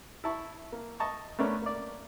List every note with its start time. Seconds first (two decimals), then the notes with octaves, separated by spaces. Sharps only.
0.24 E4 A5 C#6
0.72 A#3
1.00 D#5 A5 C#6
1.39 A3 B3 C#4 D4 A#4
1.62 A#3 D5